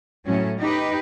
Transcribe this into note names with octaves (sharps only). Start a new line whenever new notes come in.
A2 F#3 C#4
D#4 G4 B4